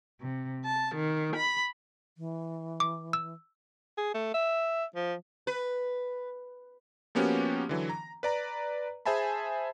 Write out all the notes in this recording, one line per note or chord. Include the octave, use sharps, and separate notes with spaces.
C3
A5
D#3
B5
E3
D6
E6
G#4
A3
E5
F3
B4
F3 A#3 B3 C#4 F#4 G4
D3 E3 F#3
A#5
B4 D5 A#5
G#4 C5 E5 G#5 A5 B5